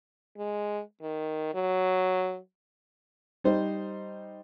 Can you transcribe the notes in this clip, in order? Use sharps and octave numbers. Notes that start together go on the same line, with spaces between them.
G#3
D#3
F#3
G3 D#4 C5